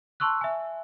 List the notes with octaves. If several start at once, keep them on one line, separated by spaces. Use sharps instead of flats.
A5 C6 C#6 E6 F#6
E5 G#5